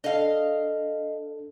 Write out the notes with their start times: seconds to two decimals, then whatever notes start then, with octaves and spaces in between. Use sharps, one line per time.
0.04 D4 A4 D#5 F5